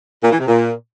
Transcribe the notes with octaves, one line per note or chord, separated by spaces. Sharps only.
A#2
E3
C3
A#2